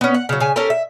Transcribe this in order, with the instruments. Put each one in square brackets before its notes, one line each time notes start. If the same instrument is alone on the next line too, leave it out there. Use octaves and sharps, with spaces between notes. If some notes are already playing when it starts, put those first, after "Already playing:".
[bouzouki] B3 C#4
F#5
C#3 F#3
C#3 G#5
C#4 G4 A4 A#4
E5